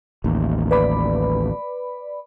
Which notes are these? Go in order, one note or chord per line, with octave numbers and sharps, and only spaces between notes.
A1 D#2
B4 D5 B5